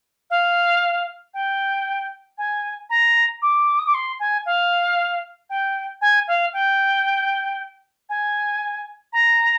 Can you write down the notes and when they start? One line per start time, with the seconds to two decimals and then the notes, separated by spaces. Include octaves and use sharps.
0.30 F5
1.34 G5
2.38 G#5
2.90 A#5
3.42 D6
3.79 D#6
3.87 D6
3.94 C6
4.20 G#5
4.46 F5
5.50 G5
6.01 G#5
6.28 F5
6.53 G5
8.09 G#5
9.13 A#5